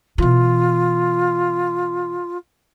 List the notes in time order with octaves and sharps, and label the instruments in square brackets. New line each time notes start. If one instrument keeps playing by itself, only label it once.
[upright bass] B2 E3 [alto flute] F4